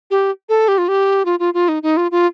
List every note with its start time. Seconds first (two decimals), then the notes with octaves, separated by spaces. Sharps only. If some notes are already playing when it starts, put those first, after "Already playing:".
0.11 G4
0.49 A4
0.68 G4
0.78 F4
0.88 G4
1.25 F4
1.40 F4
1.54 F4
1.68 D#4
1.83 D#4
1.97 F4
2.11 F4